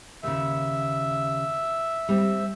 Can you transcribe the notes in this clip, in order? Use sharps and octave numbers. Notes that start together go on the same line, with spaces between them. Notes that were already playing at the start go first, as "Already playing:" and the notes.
D#2 C#3 E5
G3 C4